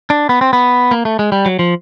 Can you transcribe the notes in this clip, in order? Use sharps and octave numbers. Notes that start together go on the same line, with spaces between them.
D4
B3
C4
B3
A#3
A3
G#3
G3
F#3
F3